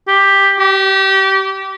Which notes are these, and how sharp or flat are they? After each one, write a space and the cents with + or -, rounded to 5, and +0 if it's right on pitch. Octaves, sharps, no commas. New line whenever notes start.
G4 +10
G4 -25